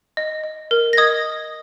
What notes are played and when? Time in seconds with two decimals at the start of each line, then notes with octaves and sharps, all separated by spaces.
0.17 D#5
0.44 D#5
0.71 A#4
0.93 A#6
0.97 D#5 D#6 G#6